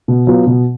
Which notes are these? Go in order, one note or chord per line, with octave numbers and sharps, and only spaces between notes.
B2
F#3 B3 F4
B2